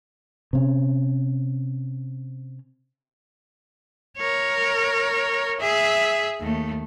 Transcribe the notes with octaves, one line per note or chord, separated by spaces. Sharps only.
C3 C#4
A#4 C#5
G#4 E5
D#2 A3